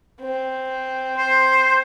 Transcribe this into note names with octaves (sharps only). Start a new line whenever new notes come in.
C4
C5